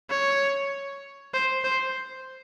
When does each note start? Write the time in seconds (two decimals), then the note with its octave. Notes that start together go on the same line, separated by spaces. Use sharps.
0.10 C#5
1.34 C5
1.64 C5